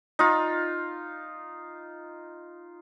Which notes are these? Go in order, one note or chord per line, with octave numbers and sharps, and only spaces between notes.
D#4 F4